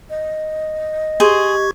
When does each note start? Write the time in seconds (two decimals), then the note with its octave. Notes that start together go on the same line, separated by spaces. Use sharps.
0.10 D#5
1.20 G4 G#4 C5 C#6 G#6